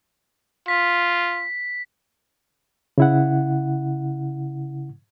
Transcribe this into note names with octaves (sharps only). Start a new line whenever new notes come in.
F4 B6
C#3 E4 F#5